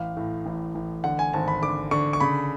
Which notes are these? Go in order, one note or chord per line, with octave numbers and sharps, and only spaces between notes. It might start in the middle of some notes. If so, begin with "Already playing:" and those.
Already playing: A1 F5
A2
A1
A1
D3 F#5
G#5
G#1 A5
B5
D3 D6
D3 C#6
C#6
C#3 B5